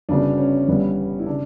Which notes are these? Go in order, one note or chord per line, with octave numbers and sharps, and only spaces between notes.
G1 F#2 C#3 F#3 B3 D4
C#4
G1 G2 E3 G3 B3
E4
C#3 D4